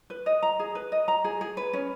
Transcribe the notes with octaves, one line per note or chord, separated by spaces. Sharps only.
B4
D#5
A#5
G#4
B4
D#5
A#5
G#4
G#4
B4
C#4